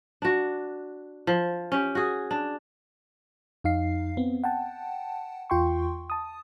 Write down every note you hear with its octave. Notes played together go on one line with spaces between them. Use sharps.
D4 F#4
F3
C#4 G4
F#4 G#4
D4
F2 D#4 F5 C7
B3 C4
F#5 G5 A5
E2 F4 G5 C6 C#6
A5 D#6